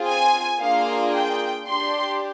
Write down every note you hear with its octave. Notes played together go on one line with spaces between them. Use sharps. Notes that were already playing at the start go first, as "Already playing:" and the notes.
Already playing: C4 F4 G#4
G#5
A#3 D4 F4 G#4 F5
G5
D4 G4 C6